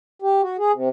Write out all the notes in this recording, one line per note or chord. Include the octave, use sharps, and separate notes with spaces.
G4
F#4
G#4
C3